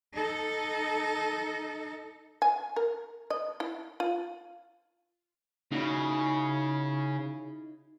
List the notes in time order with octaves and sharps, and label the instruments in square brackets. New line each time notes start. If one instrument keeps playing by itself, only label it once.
[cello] D#4 A4
[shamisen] G#5
A#4
D#5
E4
F4
[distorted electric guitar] C#3 [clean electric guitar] D#4 E4 F#4